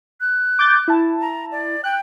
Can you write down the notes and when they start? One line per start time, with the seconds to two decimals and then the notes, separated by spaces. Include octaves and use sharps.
0.20 F#6
0.59 D6 G6 A6
0.88 E4 A5
1.21 A#5
1.51 D5
1.84 G5 F#6